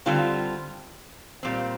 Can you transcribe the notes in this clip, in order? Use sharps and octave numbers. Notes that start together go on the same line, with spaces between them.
D3 G3 C4 F4
A#2 G3 C4